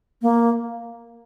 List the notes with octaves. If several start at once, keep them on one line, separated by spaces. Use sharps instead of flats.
A#3